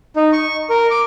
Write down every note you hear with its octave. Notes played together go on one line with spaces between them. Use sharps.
D#4
C#6
A#4
D6